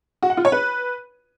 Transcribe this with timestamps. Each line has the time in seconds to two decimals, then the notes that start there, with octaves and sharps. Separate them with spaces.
0.22 F#4
0.30 F#5
0.37 F4
0.45 C#5
0.52 B4